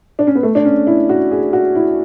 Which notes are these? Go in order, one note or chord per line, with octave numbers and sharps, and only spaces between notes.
D4
C#4
B3
A3
D4
C#4
E4
F#4
G#4
F#4
E4